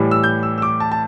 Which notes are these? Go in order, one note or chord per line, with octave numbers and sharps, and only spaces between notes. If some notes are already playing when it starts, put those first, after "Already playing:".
Already playing: A2 E3 G3
E6
G6
E6
E6
D6
A5
A5